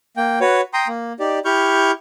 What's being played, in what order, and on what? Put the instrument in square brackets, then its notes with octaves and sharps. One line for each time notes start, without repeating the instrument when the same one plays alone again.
[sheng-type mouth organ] A#3 G5
F#4 B4 C#5
G5 A#5 C6 D#6
A#3
D#4 G4 D5
E4 G4 C#6 F6 G6